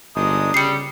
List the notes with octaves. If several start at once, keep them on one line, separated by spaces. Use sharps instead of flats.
G1 G#3 D4 D#4 D#6
C#3 G3 C7 C#7